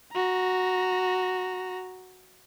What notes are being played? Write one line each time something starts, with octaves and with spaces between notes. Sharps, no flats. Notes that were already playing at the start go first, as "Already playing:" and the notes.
F#4 A#5